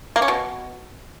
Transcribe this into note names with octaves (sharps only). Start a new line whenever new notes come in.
A#3
C#4
B2